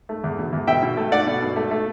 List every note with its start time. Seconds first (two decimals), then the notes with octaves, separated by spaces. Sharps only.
0.09 A3
0.24 E2
0.39 B2
0.53 E2
0.67 B2 E5 G5
0.82 B2
0.97 A3
1.12 A3 D5 F#5
1.27 B2
1.42 B2
1.56 A3
1.71 A3